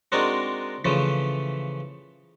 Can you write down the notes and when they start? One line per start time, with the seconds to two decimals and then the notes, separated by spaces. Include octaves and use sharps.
0.12 G#3 C4 D4 D#4 F#4 A#4
0.85 C#3 E3 F3 A3